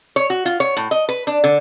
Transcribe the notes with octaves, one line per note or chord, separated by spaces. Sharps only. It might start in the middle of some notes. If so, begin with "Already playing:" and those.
C#5
F#4
F4
C#5
A2
D#5
B4
D4
D3